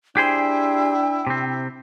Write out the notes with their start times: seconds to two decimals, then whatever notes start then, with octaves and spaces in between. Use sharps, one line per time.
0.17 D4 E4 G4 G#4 C5 G5
1.27 C3 C4